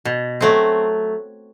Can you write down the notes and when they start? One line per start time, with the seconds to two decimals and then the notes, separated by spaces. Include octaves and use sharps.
0.05 B2
0.41 F#3 A3 C4